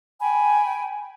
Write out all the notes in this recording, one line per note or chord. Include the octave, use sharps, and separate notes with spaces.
G5 G#5 B5